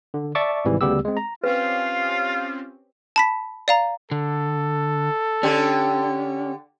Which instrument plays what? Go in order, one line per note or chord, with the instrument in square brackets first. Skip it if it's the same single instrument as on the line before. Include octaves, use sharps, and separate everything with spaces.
[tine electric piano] D3
D5 E5 A5 C#6 D6
G#1 G#2 C3 E3 G3
D2 C#3 G3 B3 G4 E6
G#3 C4
A#5
[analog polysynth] C4 C#4 G4 [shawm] F4 [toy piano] B4 [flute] F5
[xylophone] A5 B5 B6
D5 F5 A#5
[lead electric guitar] D3 [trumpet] A4
[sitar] D3 G4 [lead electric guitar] C#4